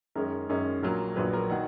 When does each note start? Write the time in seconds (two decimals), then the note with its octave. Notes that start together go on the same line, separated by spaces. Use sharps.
0.15 F#2 D#3 G#3 C#4 A#4
0.49 F#2 D#3 G#3 C#4
0.82 A#1 A#2 F#3 A#4
1.16 A#1 A#2 F#3 B4
1.33 A#4
1.50 D#3 F#3 F#5